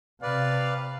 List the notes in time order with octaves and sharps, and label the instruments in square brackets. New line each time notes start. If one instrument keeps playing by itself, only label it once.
[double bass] C3 [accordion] B4 D5 [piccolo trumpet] F5